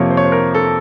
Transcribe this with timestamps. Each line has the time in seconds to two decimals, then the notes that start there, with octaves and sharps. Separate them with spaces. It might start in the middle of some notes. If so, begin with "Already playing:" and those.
Already playing: F2 C3 F3 A#3 A#4 C#5
0.10 C5
0.17 C#5
0.25 C5
0.32 A#4
0.55 A4